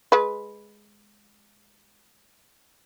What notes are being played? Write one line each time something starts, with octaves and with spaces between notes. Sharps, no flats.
G#3 B4